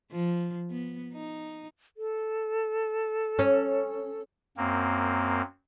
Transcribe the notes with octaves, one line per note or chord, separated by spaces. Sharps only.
F3
B3
D#4
A4
C#4
F#2 A#3 C4